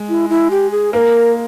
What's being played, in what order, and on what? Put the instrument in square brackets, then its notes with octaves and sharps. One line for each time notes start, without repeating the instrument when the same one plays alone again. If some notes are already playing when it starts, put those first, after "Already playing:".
Already playing: [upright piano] G#3
[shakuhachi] E4
E4
G4
G#4
[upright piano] A#3 [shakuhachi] A#4 B4